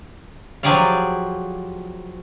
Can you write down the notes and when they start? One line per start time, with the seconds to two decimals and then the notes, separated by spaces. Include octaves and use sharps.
0.63 F3 F#3 G4 G#4 D5 F5